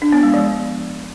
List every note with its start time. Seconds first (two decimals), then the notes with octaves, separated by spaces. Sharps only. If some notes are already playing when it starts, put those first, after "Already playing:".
0.02 D4
0.12 B3
0.23 G#3
0.34 F3